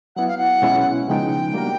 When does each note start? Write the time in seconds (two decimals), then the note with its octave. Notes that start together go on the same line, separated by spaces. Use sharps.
0.16 F#3 B3 E4 F#5
0.28 F5
0.38 F#5
0.62 B2 G#3 C#4 E4
1.08 C#3 F3 G#3 B3 D#4 G5
1.54 G3 A#3 D4 F#4 A#4